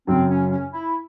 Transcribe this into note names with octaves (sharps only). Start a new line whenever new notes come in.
F#2 C#3 F#3 C4
C#4
C#4
E4